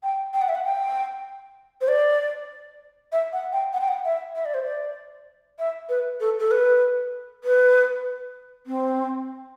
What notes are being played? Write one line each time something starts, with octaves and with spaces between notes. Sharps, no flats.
G5
G5
F#5
E5
F#5
G5
C5
D5
E5
F#5
G5
F#5
G5
F#5
E5
E5
D5
C5
D5
E5
B4
A4
A4
B4
B4
C4